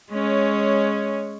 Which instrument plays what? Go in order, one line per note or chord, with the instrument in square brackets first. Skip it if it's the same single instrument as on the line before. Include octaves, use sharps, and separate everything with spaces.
[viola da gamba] G#3 C#4 C#5